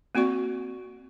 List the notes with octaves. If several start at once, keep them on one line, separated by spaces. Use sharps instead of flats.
A#3 C4 F#4 D5 C#6